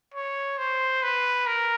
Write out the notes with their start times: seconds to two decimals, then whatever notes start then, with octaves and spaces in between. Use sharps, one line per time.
0.14 C#5
0.58 C5
1.03 B4
1.47 A#4